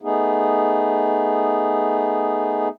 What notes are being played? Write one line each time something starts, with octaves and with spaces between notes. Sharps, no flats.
A3 B3 D#4 G#4